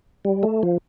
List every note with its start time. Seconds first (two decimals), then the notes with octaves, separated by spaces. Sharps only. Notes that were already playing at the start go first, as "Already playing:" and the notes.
0.25 G3
0.43 A3
0.63 F3